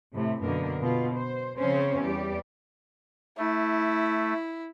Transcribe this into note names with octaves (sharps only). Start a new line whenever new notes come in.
A2 C3
F#2 B2 D3 A#3 A#4
B2 F4
C5
C#3 F3 C4 C#4 C5 C#5
E2 G3 G4 D5
A3 E4